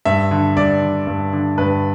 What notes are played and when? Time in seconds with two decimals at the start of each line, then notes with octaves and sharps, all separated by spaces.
0.05 G2 E5
0.31 D3
0.57 G2 D5
0.82 D3
1.07 G2
1.33 D3
1.58 G2 B4